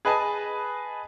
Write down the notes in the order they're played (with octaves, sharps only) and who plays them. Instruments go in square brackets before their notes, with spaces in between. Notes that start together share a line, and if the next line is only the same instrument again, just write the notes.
[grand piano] G#4 B4 D#5 G#5 A5